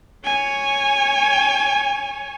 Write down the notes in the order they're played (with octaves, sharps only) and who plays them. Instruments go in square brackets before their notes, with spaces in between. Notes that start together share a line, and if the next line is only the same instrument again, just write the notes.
[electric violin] C#5 G#5